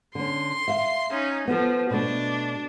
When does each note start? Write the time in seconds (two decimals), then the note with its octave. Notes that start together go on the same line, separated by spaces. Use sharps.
0.15 D3 C#4 C6
0.68 E5 F5
1.11 C#4 D#4
1.48 F3 B3 A4
1.91 B2 A3 D4